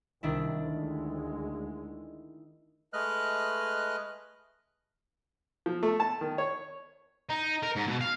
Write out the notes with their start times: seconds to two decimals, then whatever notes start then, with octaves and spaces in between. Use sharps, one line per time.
0.23 C2 D#3 D4 E4
0.71 D2 G#3
2.93 G#3 A3 B4 D#5 F6 F#6
5.66 F3
5.83 A3
6.00 A5
6.21 D#3
6.38 C#5
7.29 D#4
7.63 A#4
7.76 G#2
7.87 B2
8.01 F5